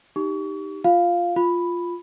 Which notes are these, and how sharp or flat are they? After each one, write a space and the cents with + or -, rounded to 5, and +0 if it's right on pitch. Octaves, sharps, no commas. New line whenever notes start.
D#4 +0 G4 +0 C#6 +35
F4 +0 F5 +0
F4 +0 B5 +0